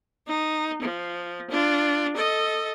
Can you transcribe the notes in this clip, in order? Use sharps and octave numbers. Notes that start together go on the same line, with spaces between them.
D#4
F3
D4 F4
A4 D#5